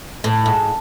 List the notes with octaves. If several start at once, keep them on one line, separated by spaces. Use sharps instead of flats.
A2
G#2